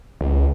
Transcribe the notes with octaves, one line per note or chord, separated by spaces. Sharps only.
C#2